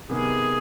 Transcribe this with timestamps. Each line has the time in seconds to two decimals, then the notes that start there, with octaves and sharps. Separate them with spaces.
0.09 C3 D#3 B3 G#4